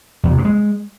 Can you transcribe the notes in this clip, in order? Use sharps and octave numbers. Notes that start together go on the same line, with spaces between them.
E2
C3
G2
G#3